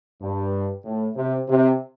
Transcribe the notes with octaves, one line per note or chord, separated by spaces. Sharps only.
G2
A2
C3
C3